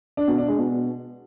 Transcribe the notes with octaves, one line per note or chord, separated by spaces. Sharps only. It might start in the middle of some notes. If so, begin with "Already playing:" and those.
D4
B2
D4
G#3
B2